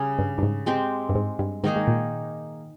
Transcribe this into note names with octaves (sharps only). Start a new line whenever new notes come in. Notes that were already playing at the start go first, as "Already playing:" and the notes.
Already playing: C#3 G3 C#4 G#4
G2
G2
G#2
G#3 C4 G4
G2
G#2
G2
G#2 D#3 A#3 D#4 G#4
G#2
A#2